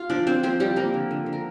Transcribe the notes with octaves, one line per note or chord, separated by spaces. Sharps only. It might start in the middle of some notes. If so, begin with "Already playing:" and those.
Already playing: F4 F5
F3 D4 D5
C4 D4 C5
F3 C4 C5
F3 G3 G4
F3 A#3 A#4
D3
D3
D3
A#4